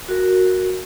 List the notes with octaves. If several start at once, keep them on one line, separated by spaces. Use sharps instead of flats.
F#4 A#4